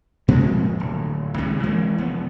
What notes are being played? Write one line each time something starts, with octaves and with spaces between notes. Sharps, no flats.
A#2 F3 G#3 A#3
D1
C#2 C3 D#3 G#3
E3 G#3 A#3
F1 B3